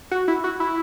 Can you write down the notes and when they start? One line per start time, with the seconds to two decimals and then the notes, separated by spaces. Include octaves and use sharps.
0.11 F#4
0.28 E4
0.44 F#4
0.60 E4